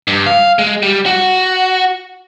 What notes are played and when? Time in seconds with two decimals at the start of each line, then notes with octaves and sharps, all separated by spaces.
0.07 G2
0.26 F5
0.59 G#3
0.83 G3
1.06 F#4